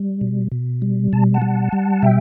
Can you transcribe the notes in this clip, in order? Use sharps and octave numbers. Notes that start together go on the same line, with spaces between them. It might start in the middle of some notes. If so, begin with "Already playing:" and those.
Already playing: G3
B2
B2
G3
B2 A5
F#5 A5
G3
G3
B2 E5 G5